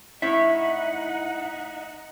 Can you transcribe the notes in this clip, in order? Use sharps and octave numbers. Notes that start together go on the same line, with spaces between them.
A2 D#4 E4 C#5 E5 F#5